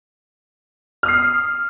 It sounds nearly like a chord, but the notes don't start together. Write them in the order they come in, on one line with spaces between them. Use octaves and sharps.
F6 D#6 C7